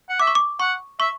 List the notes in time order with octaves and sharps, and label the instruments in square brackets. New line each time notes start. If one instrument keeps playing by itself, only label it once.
[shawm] F#5
[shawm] E5 [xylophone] D6
[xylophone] C#6
D6
[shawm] F#5 [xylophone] C#6
[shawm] E5 [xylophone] C#6